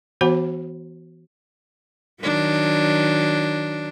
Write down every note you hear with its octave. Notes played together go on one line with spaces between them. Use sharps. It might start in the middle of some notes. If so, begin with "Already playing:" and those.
E3 B3 F#4 C5 F#5 B5
D#3 F#3 D4